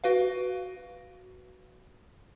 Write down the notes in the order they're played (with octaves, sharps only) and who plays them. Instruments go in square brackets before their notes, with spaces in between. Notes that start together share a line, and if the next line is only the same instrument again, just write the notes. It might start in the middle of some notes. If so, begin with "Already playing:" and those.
[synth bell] F#4 B4 F5